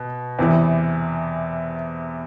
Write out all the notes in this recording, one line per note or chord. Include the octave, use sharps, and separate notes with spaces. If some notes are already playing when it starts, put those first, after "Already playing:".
Already playing: B2
E2 C3 E3